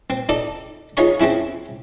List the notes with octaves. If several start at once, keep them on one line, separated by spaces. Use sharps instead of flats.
C4
D#4 A4 D5
D#4 F4 G#4 C#5 A#5 C#6
C4 C#4 E4 G#4